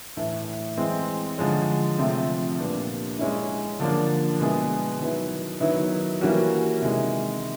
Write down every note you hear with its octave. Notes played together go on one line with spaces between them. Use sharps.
A2 E3 A3
E3 G#3 C4
D3 F3 G#3 C#4
C3 F3 A3 C4
A#2 G3 B3 D4
G#3 C#4 E4
D3 F3 A#3 D4
B2 G#3 B3 E4 G#4
D#3 F#3 B3 E4
D#3 F#3 B3 E4
E3 G3 A#3 C#4 F#4
C3 D#3 G#3